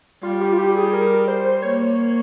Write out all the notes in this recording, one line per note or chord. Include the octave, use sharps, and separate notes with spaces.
G3 F4
G4
F4
G4
G#4
A#4
C5
A#3 C#5